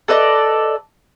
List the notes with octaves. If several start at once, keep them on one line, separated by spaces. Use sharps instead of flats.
A4 B4 D5 D#5